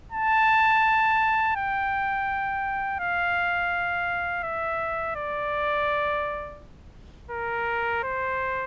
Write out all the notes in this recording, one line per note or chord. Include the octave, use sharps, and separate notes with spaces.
A5
G5
F5
E5
D5
A#4
C5